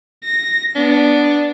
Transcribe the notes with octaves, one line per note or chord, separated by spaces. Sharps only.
A#6
B3 D4